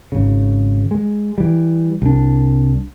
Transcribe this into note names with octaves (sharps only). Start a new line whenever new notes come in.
G#1 C#3
G#3
E3 G3
C2 D4